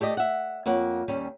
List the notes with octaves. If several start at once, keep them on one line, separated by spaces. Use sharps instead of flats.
A3 G4 D5 D#5
E5 F#5
F2 A#3 C#5 F#5
D#2 G3 C#4